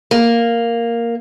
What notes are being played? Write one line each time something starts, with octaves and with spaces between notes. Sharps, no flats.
A#3